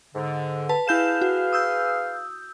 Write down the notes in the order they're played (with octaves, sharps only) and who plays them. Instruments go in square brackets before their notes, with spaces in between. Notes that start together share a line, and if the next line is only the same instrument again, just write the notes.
[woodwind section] G#2 D3
[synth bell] B4 A5
[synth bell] E4 G6 E7 [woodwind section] G#4 B4 F5
[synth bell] F#4
D#6 E6 G6